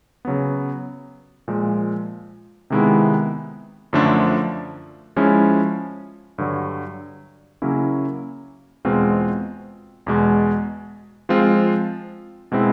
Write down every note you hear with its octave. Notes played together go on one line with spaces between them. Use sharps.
C#3 F#3 B3
A#2 F3 G#3
C3 D#3 G#3 B3 E4
F#2 D3 F3 A3 D4
F3 G#3 C#4 E4
G2 D3 F#3
C#3 F#3 A#3 C#4 E4
E2 B2 G#3 C4 F4
E2 B2 G#3
F3 G#3 C4 F4
B2 G#3 C4 E4